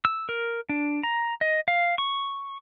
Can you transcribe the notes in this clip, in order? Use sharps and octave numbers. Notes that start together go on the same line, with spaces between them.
E6
A#4
D4
A#5
D#5
F5
C#6